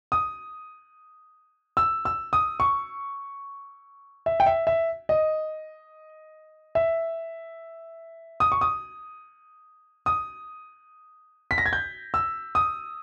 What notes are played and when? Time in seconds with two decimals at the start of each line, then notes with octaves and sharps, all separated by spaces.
0.12 D#6
1.77 E6
2.05 E6
2.33 D#6
2.60 C#6
4.26 E5
4.40 G5
4.46 E5
4.67 E5
5.09 D#5
6.75 E5
8.40 D#6
8.52 C#6
8.61 D#6
10.06 D#6
11.51 B6
11.58 A#6
11.66 G#6
11.73 G6
12.14 E6
12.55 D#6